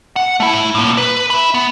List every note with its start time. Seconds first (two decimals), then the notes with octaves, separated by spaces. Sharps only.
0.16 F#5
0.40 A3 E4
0.75 A2 A#3
0.97 B4
1.30 E5 B5
1.54 B3